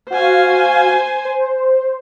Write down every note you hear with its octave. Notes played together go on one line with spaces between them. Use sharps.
F#4 C5 F5 G#5
C5